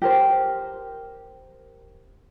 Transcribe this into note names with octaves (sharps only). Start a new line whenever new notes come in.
G4 A#4 C5